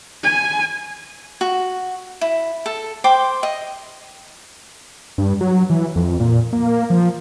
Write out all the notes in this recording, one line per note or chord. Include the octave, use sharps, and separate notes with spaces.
G#5
F#4
E4
A4
C5 G5 C6 D6
D#5
G2
F#3
E3
F2
A#2
A#3
F3